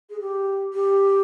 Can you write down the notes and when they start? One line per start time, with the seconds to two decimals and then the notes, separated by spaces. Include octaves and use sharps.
0.10 G#4
0.20 G4
0.73 G4